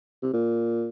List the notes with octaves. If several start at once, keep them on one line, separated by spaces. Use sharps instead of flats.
C3
A#2